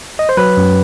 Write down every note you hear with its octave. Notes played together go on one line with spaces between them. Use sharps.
D#5
C5
F#3 B4
F#2